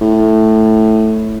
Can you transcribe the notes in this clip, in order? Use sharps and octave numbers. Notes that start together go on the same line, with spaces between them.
A2